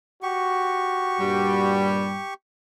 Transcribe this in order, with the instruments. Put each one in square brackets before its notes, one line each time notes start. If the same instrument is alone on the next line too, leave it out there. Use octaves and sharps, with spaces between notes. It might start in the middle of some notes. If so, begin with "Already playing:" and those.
[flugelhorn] F#4 [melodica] G4 C#6
[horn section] G2 A#2 G3